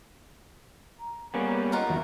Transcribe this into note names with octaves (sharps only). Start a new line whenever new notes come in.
A#5
G3 A#3 B3 C#4
F4 A#4 D#5 F#5
E2 D#3 F#3 E5